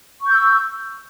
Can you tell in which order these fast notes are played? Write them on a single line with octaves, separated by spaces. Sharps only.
C#6 G6 E6